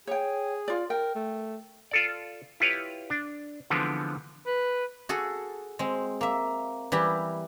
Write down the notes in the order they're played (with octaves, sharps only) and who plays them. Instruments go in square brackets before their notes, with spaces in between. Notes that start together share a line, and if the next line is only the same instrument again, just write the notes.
[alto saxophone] G#4 [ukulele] C#5 G5
[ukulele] F4 D5
[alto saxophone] A#4 [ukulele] G5
[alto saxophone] A3
[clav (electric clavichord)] F4 A4 D5
E4 F4 G4 B4 C#5 F5
D4
D3 E3 F3 G#3 B3 C4
[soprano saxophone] B4
[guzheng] F#4 G#4 A4
G#3 C4
A#3 E5
E3 G3 E4 G4